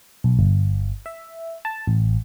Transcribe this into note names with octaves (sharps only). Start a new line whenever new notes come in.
B1
G1
E5
A5
A1